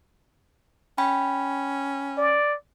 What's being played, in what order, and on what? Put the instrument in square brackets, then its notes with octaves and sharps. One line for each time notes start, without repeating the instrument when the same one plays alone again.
[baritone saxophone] C#4 [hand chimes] G5 B5
[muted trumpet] D5